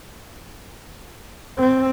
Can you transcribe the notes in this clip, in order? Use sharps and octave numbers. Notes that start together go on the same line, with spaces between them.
C4